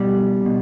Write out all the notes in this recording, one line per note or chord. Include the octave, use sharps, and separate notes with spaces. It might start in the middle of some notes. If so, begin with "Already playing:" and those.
Already playing: B2 G3
B2